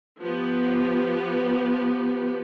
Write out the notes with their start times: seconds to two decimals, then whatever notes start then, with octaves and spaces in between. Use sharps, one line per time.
0.21 F3 B3 G4